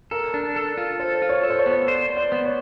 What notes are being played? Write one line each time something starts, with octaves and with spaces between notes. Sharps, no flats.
A4 A#4
D4
A4
F4
A4 C5
F4
C#5
A4
C5
C#5
B3
C5 D5
C5
D5
B3
C#5